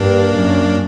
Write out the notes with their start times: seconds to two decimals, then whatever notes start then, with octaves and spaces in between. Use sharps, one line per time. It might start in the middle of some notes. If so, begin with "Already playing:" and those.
Already playing: G2 A#3 D4
0.36 F#2